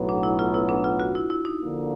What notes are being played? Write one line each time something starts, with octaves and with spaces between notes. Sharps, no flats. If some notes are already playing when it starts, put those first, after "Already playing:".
Already playing: B1 A2 F#3 B3
D4
E4
F4
E4
D4
F4
F#4
E4
E4
D#4
D3 F3 A#3